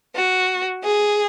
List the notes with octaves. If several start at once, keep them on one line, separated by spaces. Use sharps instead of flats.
F#4
G#4